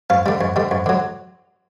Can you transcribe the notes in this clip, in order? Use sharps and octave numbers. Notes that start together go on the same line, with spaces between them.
F#2 F5
D3 G3
F#2
D3 G3
F#2
D3 F#3